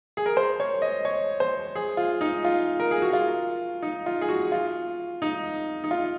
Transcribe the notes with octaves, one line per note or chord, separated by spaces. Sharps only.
G#4
A#4
C5
C#5
D#5
C#5
C5
G#4
F4
D#4
F4
A#4
G#4
F#4
F4
D#4
F4
G#4
F#4
F4
D#4
D#4
F4